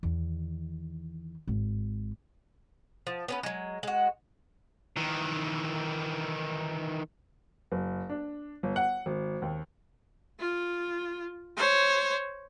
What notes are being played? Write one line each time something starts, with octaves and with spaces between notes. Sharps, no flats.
E2 D#3
G#1
F3
B3 C#4 B4
F#3 G#3
G#3 F#4
D#3 E3
F#1
D4
G1
F#5
G#1
D#2
F4
C5 C#5